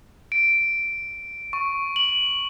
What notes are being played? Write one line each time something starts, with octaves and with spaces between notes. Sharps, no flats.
D7
C#6
F#7